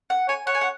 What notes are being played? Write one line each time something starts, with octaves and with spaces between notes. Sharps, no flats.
F#5
C#5 G#5
C#5 F#5
G#5
F#5